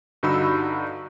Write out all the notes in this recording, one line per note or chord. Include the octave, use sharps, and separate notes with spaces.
G2 D3 D#4 F#4 B5 E6